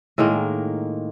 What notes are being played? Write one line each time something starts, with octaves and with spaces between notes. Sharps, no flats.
A2 D#3 G#3 A#3